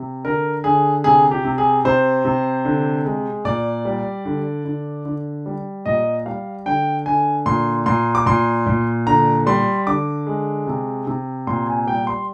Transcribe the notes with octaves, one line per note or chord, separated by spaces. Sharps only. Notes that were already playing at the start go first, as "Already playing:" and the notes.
Already playing: C3
D3 A#4
D3 G#4
C3 G#4
G4
C3
G#4
C3 C5
C3
D3
G#3
A#2 D5
G3
D3
D3
D3
G3
A#2 D#5
G3 F5
D3 G5
D3 G#5
A#2 C6
A#2 C6
D6
A#2 C6
A#2
D3 A#5
G3 C6
D3 D6
G#3
C3
C3
A#2 C6
G#5
G3 G5
C6